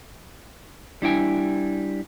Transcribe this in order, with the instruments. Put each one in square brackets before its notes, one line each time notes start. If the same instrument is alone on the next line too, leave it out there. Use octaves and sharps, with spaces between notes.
[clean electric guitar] G3 D4 E4 G5 G#5